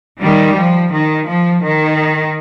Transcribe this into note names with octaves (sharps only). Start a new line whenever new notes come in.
D#3 G3
F3
D#3
F3
D#3